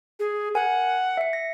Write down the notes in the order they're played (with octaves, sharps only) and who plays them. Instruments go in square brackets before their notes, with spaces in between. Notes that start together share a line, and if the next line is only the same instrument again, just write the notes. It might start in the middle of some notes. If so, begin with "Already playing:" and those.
[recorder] G#4
[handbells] A#4 G#5 [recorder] F#5
[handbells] E5 C#7
A#6